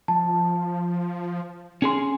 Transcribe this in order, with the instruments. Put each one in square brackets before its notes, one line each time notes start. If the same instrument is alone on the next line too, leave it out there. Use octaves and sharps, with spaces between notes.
[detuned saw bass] F3 [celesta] A5
[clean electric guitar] C#4 G#4 C6